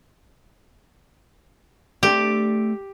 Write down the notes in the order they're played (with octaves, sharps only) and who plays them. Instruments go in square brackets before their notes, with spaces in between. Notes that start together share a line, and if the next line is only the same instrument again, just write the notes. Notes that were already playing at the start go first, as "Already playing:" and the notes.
[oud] A3 C4 D4 [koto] G4